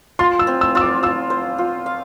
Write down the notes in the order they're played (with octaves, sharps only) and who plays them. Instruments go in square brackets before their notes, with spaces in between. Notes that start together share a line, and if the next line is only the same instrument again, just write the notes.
[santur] F4 [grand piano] C6
[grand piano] E6
[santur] C4
[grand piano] E6
[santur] F4 [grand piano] E6
[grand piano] D6
[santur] F4 [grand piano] E6
[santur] C5
F4
F5